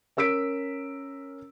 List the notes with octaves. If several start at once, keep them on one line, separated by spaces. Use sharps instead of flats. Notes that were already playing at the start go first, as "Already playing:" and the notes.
C#4 A#4 E6 B6 D7